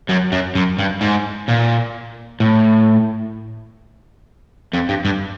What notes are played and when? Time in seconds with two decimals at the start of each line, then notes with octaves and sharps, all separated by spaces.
0.09 F#2
0.32 F#2
0.55 F#2
0.79 G2
1.01 G#2
1.48 A#2
2.40 A2
4.74 F2
4.89 G2
5.05 G2